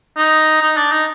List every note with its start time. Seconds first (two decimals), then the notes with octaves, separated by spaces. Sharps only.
0.17 D#4
0.61 D#4
0.77 D4
0.91 D#4